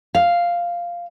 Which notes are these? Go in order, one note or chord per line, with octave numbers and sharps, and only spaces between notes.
F5